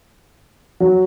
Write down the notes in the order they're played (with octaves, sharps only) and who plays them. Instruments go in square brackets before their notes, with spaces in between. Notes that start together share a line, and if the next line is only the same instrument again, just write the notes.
[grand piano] F#3